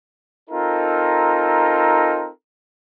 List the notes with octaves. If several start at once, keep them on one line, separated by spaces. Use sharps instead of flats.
C4 D#4 F4 A4 A#4